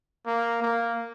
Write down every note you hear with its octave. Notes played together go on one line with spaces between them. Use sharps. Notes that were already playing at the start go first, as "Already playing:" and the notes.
A#3
A#3